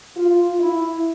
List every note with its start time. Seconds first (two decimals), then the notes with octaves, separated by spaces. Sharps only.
0.17 F4
0.59 E4